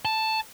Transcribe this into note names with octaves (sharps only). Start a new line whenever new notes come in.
A5